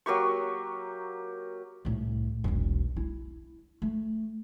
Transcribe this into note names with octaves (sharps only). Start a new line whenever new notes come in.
F#3 A#3 G4 C#6
C2 A2
E1 B1
E4
A3